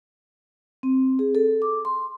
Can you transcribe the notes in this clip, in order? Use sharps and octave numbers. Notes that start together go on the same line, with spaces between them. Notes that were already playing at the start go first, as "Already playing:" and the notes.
C4
G#4
A4
D6
C6